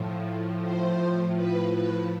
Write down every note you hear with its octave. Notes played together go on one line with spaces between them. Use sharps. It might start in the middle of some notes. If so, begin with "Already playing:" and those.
Already playing: A2 F3
C5
B4
B4